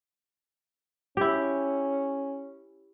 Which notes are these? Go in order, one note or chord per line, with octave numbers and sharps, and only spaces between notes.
C#4 E4 G4